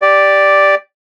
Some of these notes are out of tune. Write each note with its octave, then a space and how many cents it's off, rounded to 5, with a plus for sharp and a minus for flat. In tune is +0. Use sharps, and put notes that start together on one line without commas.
G4 +0 D5 +0